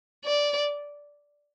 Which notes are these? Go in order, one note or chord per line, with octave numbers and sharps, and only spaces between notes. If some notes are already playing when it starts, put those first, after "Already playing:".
D5